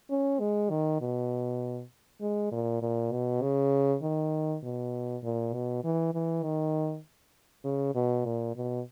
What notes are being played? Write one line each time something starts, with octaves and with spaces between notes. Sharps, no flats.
C#4
G#3
D#3
B2
G#3
A#2
A#2
B2
C#3
D#3
B2
A#2
B2
E3
E3
D#3
C#3
B2
A#2
B2